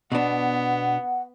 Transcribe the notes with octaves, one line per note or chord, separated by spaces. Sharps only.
B2 B3 D4 F#5